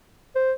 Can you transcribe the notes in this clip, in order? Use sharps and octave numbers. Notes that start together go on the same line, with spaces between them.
C5